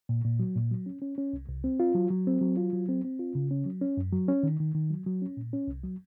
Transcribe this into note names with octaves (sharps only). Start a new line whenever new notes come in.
A#2
A#2
F#3
A#2
F#3
C#4
C#4
C#4
C2
C2
C4
F4
F#3
F#3
C4
F#3
F4
F#3
C4
C4
F4
C#3
C#4
F#3
C#4
F#2
F#3
C#4
D#3
D#3
D#3
F#3
F#3
C#4
A#2
C#4
C2
F#3